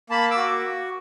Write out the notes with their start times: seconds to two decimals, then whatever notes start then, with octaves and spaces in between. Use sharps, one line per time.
0.10 A#3 A5 B5
0.31 D6 E6
0.37 F#4